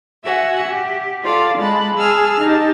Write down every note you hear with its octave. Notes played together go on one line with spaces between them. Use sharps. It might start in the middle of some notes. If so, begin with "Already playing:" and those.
F#4 E5 F#5 G#5
G4
F4 A4 D5 F5
G#3 A5 B5 F#6
G#4 A5 E6 F6
D#4 G4 A5